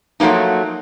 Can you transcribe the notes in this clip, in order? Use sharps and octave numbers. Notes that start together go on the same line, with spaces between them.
F3 F#3 A3 A#3 D#4